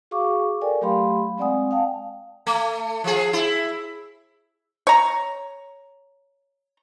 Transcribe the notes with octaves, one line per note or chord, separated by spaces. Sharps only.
F#4 G#4 F5 C#6 D6
A4 A#4 D5 G5 G#5
F#3 A3 G4 F5 B5 C6
G#3 C4 D5 F#5 G#5 D#6
F5 G5 A5
A3
F3 G#4
E4
C#5 A#5